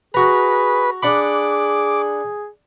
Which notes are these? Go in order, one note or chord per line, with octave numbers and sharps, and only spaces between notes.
F#4 G#4 B4 A#5
D4 G#4 F#5 B5 D6